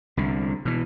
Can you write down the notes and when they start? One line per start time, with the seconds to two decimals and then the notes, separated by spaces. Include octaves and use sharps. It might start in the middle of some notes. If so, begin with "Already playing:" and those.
0.17 C2 D3
0.65 B2 E3